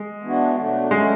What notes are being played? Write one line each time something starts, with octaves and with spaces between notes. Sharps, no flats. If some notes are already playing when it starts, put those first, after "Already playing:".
Already playing: G#3
E3 B3 D4 F#4
B2 F#3 A3 D4
F#3 G#3 A3 C#4